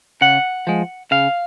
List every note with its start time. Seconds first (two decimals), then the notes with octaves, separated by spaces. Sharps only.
0.21 C#3 F#5
0.67 F3 G#3
1.11 C#3 F5